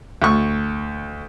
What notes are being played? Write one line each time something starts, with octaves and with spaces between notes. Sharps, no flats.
D2 C#6